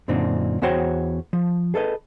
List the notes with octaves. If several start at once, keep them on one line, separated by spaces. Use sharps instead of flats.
F#2 A#2 D3 C4 D4 D#4
E2 B3 F#4 C5 C#5 G5
F3
G#4 A4 B4 D#5